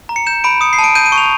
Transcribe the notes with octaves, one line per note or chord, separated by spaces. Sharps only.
A#5
C#7
G6 E7
B5 D7
D#6 C#7
C7
A5
D7
G6 D#7
D#7
C#6
F7